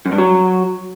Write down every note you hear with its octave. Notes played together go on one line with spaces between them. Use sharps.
F#2
G2
F#3